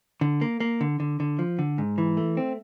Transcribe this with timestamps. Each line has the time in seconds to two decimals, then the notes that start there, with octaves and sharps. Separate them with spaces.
0.21 D3
0.41 A#3
0.60 A#3
0.81 D3
1.00 D3
1.20 D3
1.39 F3
1.59 D3
1.78 G#2
1.98 E3
2.17 A3
2.37 C4